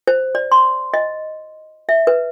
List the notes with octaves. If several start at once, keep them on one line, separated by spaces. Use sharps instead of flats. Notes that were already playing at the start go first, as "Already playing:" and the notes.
C5
D5
C6
D#5
E5
B4